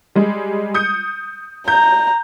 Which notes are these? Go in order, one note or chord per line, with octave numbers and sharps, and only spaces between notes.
G3 G#3
D#6 G6 C#7
A#5 G6